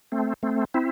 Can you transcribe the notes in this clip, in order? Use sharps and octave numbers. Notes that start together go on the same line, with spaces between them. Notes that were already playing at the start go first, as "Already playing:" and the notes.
A3 C4
A3 C4
C4 E4